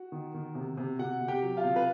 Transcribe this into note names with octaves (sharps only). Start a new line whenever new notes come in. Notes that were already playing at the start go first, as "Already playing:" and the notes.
Already playing: F#4
D#3
D#3
C3
C3
C3 F#4 F#5
C3
G4 G5
F#3
F4 F5
C3
B4